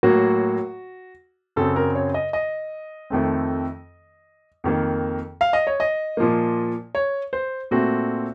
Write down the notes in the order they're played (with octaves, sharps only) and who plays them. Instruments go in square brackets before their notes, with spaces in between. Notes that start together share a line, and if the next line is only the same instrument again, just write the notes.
[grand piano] A2 F#3 A#3 F#4
F#2 C#3 F#3 C4 A4
A#4
C#5
D#5
D#5
F2 D#3 A3 C4
F2 D#3 A#3
F5
D#5
C#5
D#5
A#2 F3 A#3
C#5
C5
A#2 A3 C4 F#4